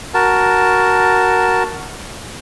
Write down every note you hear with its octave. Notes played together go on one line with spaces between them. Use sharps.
F#4 A#4 A5